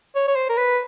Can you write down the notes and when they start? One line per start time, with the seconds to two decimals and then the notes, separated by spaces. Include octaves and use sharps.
0.15 C#5
0.28 C#5
0.36 C5
0.49 A#4
0.57 B4